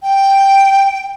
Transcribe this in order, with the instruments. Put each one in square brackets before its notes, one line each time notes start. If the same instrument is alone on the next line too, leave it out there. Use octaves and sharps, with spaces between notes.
[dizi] G5